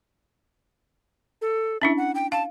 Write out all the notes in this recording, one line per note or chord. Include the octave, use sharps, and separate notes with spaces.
A4
C#4 D4 E4 E5
F#5
G5
F5 A5